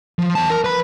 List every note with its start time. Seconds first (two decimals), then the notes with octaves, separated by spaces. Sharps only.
0.19 F3
0.35 E2 A5
0.50 A#4
0.64 B4 B5